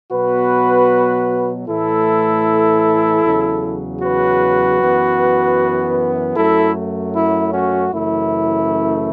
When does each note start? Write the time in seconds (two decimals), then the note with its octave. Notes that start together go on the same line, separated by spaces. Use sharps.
0.11 B2 F#3 B3 F#4 B4
1.67 A2 E3 A3 E4 A4
3.23 E2 C#3 F#3
4.01 F#4 B4
4.80 F#2 E3 B3
6.35 F#2 F#3 A3 E4 A4
7.14 E4
7.52 C#4 F#4
7.91 F#2 C#3 E3 A3 E4